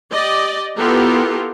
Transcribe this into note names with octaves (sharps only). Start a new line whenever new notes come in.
G4 D5 D#5
B3 E4 F4 G4 A4 A#4